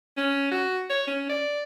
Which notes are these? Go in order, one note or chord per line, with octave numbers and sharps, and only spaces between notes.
C#4
F#4
C#5
C#4
D5